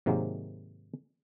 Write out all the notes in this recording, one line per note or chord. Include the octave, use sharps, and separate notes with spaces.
G#2 C3 D#3 F#3 G#3 A#3